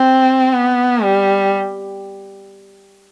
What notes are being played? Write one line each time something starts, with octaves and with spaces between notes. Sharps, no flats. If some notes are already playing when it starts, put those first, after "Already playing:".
Already playing: C4
B3
G3